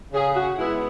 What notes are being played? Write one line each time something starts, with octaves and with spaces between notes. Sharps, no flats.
C#3 G#4
F#4
G#3 B3 E4